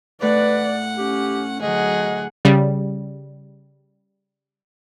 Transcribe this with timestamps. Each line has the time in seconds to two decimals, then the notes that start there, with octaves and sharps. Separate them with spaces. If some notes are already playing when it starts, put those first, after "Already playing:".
0.22 A2 A3 B4 D5 F#5 C#6
0.97 C#4 G4
1.62 D2 F#3 G#4 D#5 F#5
2.45 C#3 G3